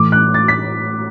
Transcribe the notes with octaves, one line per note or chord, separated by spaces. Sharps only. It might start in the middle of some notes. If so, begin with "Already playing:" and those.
Already playing: A2 E3 D6
F#6
A6
B6